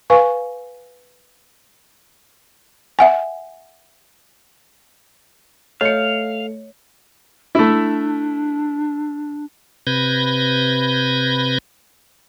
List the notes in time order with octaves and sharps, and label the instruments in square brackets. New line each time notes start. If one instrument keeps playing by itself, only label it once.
[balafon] B4 F5 G#5 C#6
E5 F#5 G#5
[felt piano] A3 C#7 [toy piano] C#5 D#5 [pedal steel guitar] F5
[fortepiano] A3 E4 [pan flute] D4
[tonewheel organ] C3 B4 G6 G#6 A#6